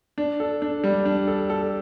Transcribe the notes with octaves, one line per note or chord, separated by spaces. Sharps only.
D4
A4
D4
G3
D4
A4
A4